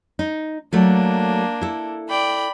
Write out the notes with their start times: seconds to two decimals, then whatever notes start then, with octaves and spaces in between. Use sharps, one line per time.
0.19 D#4
0.73 F#3 A3 A#3 D4 A4
1.61 E4 A4
2.08 D5 G5 B5